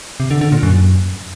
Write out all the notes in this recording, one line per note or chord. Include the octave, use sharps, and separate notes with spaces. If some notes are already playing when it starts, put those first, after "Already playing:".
C3
D3
D3
A#2
F#2